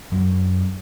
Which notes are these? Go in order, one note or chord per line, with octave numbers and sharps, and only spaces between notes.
F#2 F#3